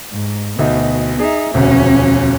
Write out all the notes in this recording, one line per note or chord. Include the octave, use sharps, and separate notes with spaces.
G#2
D2 B2 D#4
D#4 G#4 E5
E1 D2 C3 F3 C#4